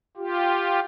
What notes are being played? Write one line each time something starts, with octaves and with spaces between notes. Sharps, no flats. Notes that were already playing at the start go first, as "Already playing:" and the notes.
F4 G4